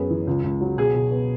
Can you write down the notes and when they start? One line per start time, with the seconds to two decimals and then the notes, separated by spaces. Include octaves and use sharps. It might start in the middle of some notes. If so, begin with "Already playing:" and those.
Already playing: F#2 B3 G#4
0.10 E3
0.27 C#2
0.44 C#2
0.61 F#3
0.77 B2 G#4
0.94 B2
1.11 B3